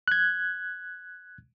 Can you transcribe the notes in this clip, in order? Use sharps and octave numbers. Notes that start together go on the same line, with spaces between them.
F#6 G#6